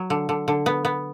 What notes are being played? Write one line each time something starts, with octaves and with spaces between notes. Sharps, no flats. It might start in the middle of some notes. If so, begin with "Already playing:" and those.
Already playing: F#3
D3
D3
D3
B3
B3